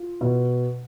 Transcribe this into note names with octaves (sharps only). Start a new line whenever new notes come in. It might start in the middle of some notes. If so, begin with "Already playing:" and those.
Already playing: F4
B2